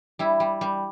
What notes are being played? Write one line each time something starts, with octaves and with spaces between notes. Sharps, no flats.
G3 E4
G3
G3